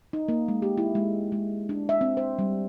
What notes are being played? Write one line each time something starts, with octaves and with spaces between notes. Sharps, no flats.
D#4
A#3
G#3
G4
E4
G#3
G#3
D4
E5
C4
C5
G3